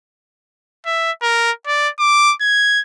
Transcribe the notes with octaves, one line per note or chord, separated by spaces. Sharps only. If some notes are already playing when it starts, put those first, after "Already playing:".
E5
A#4
D5
D6
G#6